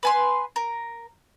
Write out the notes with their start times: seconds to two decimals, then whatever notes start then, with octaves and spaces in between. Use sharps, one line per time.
0.03 B4 G#5 C6
0.56 A#4